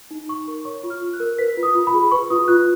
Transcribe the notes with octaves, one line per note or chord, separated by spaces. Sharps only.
D#4
D#4 C#6
A#4
C#5 C#6
F4
F6
F4
F#6
A#4
B4 B6
F4
D#6
F4
B5
G#4
B4 C#6
F4 D#6
F4 F#6